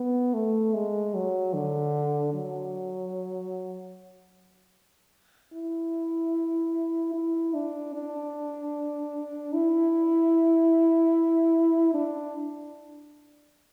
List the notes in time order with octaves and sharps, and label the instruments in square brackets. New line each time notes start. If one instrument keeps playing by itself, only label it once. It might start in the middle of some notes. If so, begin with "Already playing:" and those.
Already playing: [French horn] B3
A3
G#3
F#3
D3
F#3
E4
E4
D4
D4
E4
D4